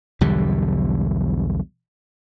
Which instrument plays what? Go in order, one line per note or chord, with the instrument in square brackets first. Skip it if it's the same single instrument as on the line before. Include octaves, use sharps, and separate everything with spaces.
[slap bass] B1 E2 D3 G3